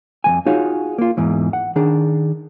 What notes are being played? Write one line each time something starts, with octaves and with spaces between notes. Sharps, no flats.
F2 E3 G#5
D#4 F4 F#4 G#4 C#5 F5
A#3 F4
E2 G#2 E3
F#5
D#3 D4 G#4